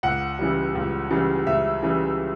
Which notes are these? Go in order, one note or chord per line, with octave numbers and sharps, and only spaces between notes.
C#2 F#5
C#3 E3 G3
C#2
C#3 E3 G3
C#2 E5
C#3 E3 G3